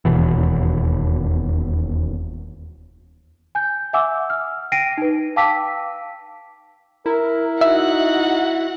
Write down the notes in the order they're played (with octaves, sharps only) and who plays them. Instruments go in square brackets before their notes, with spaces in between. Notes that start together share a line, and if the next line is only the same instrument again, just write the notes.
[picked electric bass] E1 D#2 B2 E3
[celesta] G#5 G6
E5 F#5 G#5 D6 E6
F6
G5 A#6 C7 D7 D#7
D#4 B4
F5 G5 A5 D6 E6 B6
[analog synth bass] E4 [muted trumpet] A#4
[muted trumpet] D#4 [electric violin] F#4 F#5 [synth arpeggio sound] E5